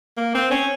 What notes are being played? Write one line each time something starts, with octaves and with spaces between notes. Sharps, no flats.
A#3
C4
C#4